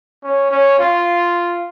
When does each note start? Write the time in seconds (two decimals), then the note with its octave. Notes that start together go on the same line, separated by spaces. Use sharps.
0.23 C#4
0.51 C#4
0.79 F4